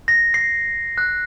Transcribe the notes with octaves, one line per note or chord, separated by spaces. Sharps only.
A#6
C7
F#6